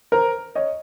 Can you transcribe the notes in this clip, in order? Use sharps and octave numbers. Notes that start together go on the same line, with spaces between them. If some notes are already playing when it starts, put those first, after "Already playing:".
A#4 C5
C#5 D#5